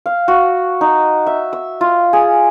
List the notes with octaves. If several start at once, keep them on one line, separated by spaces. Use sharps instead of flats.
F5
F#4
D#4
E5
E6
F4
G#4